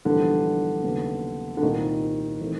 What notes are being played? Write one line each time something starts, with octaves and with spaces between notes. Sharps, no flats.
A#1 G#2 D3 E3 G3 B3
D#2 C#3 F#3 B3
D3
C2 A#2 D#3 G3 C4 D#4
E3 A3 C4